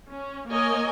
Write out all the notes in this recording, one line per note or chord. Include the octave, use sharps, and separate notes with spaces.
C#4
A#3 A#4 C#5 D#5 G#5